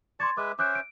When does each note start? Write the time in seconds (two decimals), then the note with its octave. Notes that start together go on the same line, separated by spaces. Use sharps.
0.20 D5 A5 C6 C#6 G#6 A6
0.37 G#3 B4 E5 D6
0.59 C#4 C5 E5 D6 F#6 D7
0.75 D7